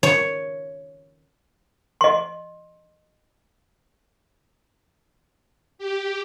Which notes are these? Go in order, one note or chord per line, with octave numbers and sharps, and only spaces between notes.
C#5
D#5 C6
G4